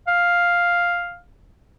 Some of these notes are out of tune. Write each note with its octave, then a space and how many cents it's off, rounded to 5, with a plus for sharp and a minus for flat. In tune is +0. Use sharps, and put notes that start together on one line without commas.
F5 +5